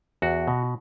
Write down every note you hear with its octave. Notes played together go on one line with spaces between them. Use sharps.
E2 F#4
B2